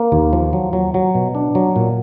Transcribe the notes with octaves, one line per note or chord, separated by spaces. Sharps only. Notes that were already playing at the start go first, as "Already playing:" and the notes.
Already playing: A#3
D#2
F3
F#3
F#3
F#3
B2
D4
F#3
A#2